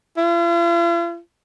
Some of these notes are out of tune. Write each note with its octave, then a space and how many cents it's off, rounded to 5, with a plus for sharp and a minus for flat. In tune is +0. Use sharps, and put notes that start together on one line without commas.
F4 -45